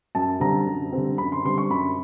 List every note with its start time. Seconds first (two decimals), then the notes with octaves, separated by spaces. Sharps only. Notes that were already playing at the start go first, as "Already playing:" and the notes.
0.15 F#2 A5
0.40 D3 G3 C4 A#5
0.67 F#2
0.92 D3 G3 C4
1.18 F#2 B5
1.32 C6
1.45 D3 G3 C4 C6
1.58 C#6
1.70 F#2 B5